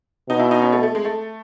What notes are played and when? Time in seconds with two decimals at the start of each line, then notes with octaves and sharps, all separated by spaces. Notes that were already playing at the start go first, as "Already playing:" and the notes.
0.29 B2 D#4
0.39 E4
0.51 D#4
0.62 C#4
0.73 A3
0.83 A3
0.95 G#3
1.05 A3